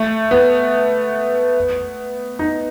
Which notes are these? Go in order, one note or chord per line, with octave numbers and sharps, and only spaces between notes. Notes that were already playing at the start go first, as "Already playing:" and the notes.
Already playing: A3
B3
D#4